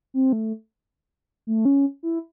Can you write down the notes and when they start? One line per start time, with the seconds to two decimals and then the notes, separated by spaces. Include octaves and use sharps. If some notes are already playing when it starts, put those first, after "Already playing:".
0.14 C4
0.33 A3
1.47 A3
1.65 C#4
2.03 E4